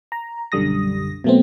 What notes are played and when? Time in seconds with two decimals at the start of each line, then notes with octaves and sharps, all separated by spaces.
0.12 A#5
0.52 B1 F#2 D3 G3 D#6 A#6
1.24 B2 F#3 A3 B3 C4